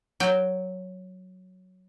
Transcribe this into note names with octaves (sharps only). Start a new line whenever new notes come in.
F#3 G5